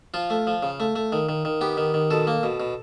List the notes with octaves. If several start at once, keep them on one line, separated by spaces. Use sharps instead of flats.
F3 F4
A3
F3
C#3
A3
A3
D#3
D#3
D#3
B3 G4
D#3
D#3
B2 A4
A#3
B2
B2